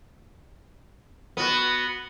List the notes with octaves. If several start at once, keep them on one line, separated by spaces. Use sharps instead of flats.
B3 F#4